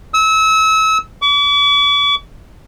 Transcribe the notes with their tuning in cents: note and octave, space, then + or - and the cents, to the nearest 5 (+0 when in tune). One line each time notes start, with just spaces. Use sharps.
E6 -30
D6 -45